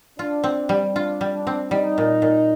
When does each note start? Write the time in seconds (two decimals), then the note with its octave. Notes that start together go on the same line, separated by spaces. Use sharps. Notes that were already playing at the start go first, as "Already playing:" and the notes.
0.18 D4 F4
0.44 C4
0.69 G3
0.95 D4 F4
1.21 G3
1.34 D4
1.47 C4
1.71 G3 D#4
1.98 A#2
2.22 A#2